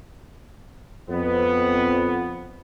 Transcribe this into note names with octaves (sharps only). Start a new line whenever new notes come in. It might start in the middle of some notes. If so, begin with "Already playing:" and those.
F2 B3